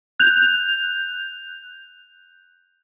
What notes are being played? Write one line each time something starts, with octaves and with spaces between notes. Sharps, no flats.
F#6 G6 F7